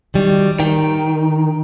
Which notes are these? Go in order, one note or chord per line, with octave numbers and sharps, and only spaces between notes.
D#3 F#3 G3
D#3 G5